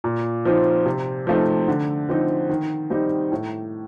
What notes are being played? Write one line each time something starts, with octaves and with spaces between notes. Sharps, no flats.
A#2
F3 C4 D#4
C3
F3 A3 C4 D#4
D3
F3 C4 D#4
D#3
G3 C4 D#4
A2